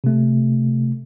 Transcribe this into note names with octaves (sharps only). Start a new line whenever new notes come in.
C3 A3